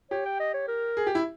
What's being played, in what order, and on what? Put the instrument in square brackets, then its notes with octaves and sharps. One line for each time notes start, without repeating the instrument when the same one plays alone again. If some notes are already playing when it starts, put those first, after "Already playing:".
[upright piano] G4 [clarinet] C#5
[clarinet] G5
D#5
C#5
A#4
[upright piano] G#4
G4
E4